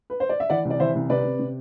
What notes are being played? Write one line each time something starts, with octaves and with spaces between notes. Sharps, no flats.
B4
C5
D5
E5
E3 D5 F#5
C2
D5
E3 C5 E5
C2
C3 B4 D5
C3
C3